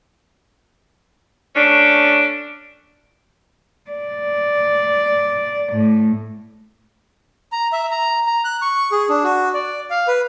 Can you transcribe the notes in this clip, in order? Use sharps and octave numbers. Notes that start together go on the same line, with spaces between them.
A3 C#4 D4
D5
A2
A#5
E5
A#5
A#5
F#6
C#6
G#4
D4
F#4
D5
F5
B4